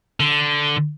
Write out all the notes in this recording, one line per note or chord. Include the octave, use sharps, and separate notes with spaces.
D3